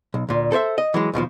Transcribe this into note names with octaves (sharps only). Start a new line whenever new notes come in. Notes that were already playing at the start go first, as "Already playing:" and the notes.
B1
D2 A#2
A4 C5 C#5 E5
D#5
E3 F#3 G#3
D#2 B2 E3 F3